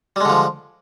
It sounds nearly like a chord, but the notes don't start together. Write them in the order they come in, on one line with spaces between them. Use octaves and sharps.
G3 G#3 D3 F3